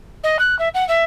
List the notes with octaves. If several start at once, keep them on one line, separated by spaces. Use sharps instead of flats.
D#5
F#6
E5
F#5
E5